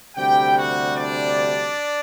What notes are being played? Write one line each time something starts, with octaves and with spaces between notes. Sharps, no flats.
D2 C3 G3 G4 G5
F#4 F#5
D4 D5